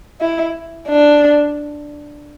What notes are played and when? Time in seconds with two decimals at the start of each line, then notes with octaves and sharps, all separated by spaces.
0.21 E4
0.88 D4